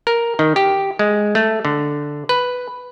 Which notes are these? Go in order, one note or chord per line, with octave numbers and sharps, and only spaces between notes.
A#4
D#3
G4
G#3
A3
D3
B4